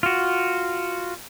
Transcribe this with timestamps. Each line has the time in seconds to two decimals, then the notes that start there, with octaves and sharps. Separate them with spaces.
0.03 F4 F#4